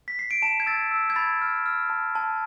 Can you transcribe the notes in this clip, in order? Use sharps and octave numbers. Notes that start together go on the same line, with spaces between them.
B6
C7
D7
A5 E7
G#6
E6 A6
E6
G#6
B5 A6
F6
F6
A5
A5